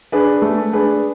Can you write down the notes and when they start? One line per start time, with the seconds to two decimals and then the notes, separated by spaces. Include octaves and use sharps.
0.12 D4 G#4 B4
0.42 A3
0.73 D4 G#4 B4